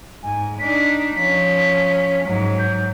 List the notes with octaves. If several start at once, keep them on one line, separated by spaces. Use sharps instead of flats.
G#2 G#5
D4 D#4 B6
F3 C#4 B6
G#2 F#3
G6